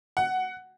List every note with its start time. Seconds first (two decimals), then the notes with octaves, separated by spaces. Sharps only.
0.17 F#5